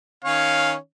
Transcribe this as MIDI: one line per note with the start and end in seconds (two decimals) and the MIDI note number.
0.25 0.75 51
0.25 0.75 61
0.25 0.75 73
0.25 0.75 77